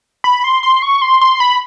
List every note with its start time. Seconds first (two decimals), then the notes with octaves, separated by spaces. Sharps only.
0.24 B5
0.44 C6
0.63 C6
0.82 C#6
1.02 C6
1.21 C6
1.40 B5